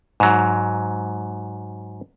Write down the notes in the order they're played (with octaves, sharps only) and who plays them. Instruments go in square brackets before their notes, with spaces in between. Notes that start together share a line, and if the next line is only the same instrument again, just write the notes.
[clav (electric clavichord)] G#2 F#3